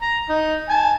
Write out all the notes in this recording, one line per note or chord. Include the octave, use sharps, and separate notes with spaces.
A#5
D#4
G#5 A5